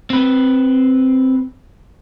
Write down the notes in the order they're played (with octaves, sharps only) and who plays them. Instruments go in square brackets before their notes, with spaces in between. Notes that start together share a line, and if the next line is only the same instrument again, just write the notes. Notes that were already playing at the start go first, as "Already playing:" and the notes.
[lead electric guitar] C4 B4